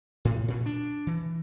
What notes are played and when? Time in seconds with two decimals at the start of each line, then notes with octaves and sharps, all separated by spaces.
0.25 A2
0.48 A#2
0.66 D4
1.07 E3